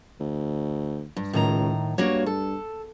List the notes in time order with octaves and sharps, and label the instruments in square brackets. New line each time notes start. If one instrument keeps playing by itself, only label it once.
[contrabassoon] D2
[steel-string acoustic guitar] G2
[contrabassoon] C#2 [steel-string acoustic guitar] A2 D#3 A#5
[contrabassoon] G2 [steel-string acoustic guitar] A#3 F#4 C#5
[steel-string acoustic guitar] A4